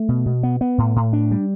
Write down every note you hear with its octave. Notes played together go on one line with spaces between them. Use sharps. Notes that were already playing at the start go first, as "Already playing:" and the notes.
Already playing: A3
B2
B2
B3
B3
A2
A2
D4
G3